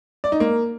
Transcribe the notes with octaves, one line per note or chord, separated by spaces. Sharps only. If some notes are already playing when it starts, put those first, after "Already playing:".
D5
D#4
A#3